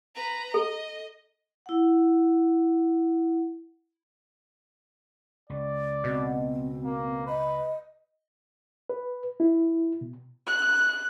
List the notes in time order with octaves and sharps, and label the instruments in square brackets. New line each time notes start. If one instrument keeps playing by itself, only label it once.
[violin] B4 A#5
[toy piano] A4 [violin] D#5
[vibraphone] E4 F#5
[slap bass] C#2 [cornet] D5
[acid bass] B2 [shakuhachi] C4
[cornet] A#3
[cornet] B4 [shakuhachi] D#5
[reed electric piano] B4
E4
B2
[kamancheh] F#6